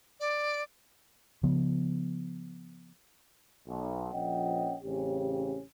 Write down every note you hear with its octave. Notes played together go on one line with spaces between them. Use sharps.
D5
C#3 F3 B3
B1
A#1 F3 C#4 D#5 F#5 G5
A1 C#3 C4 C#4 G4